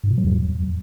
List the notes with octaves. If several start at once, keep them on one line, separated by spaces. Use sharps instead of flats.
G#2
A#2
F#3
E2